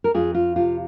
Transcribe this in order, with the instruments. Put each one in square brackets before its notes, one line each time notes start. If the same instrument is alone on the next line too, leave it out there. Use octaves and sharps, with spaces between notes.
[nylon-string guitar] A#4
F2 F4 G#4
F4
C3 F4